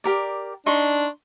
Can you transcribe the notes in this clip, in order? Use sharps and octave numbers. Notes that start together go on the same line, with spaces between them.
G4 A#4 D5
D4 D#4 C6 C#6